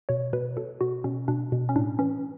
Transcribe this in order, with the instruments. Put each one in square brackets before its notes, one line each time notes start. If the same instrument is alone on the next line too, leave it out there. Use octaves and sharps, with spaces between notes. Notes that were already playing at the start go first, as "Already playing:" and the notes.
[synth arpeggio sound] B2 C#5
B2 B4
B2 A4
B2 F#4
B2 C#4
B2 D4
B2
C#4
A2 D4
E3 C#4